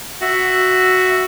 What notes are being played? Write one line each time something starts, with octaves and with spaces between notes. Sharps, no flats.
F#4 E5